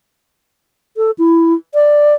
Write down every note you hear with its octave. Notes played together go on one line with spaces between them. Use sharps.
A4
E4
D5